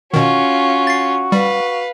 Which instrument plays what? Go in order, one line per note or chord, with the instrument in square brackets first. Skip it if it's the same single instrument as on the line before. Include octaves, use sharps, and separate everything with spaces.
[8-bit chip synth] B2 D#3 [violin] C#4 F4 [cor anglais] F#4
[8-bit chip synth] A6 C7
[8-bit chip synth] G3 [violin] B4 F5